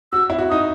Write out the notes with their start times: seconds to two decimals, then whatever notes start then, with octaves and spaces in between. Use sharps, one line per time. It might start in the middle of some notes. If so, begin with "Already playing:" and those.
0.12 F#4 E6
0.30 E4
0.38 F#4
0.50 D#4 D#6